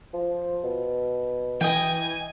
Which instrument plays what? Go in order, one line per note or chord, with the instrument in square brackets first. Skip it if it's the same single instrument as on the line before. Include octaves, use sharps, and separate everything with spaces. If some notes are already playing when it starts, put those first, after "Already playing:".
[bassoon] F3
B2
[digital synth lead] E3 [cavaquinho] D#5 G5 [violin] G#5